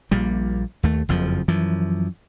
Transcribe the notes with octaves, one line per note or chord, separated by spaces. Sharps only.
A#1 A#2 G3
D#2 A3
F#1 F2 F3
F#2 E3 F3